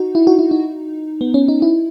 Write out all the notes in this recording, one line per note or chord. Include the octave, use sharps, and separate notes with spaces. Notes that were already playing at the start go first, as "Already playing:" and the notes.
Already playing: D#4 F#4
E4
F#4
E4
D#4
B3
C#4
D#4
E4